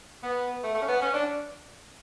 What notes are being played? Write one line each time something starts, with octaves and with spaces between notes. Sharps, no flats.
B3
A3
A3
C#4
B3
C#4
D4